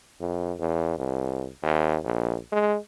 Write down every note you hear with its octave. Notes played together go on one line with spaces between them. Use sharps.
F2
E2
C2
D#2
A#1
G#3